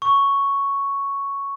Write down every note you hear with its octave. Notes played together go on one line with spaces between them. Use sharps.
C#6